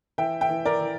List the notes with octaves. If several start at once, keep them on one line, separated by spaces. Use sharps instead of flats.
E3 E5 G5
E5 G5
E3
A#4 D5
E3